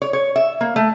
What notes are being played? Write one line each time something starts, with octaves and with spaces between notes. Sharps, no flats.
C#5
C#5
E5
A#3
A3